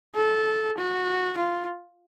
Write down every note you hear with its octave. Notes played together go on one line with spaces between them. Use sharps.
A4
F#4
F4